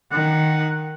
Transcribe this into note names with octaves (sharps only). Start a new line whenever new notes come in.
D#3 F#5